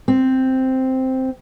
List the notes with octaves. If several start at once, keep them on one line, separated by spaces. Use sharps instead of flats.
C4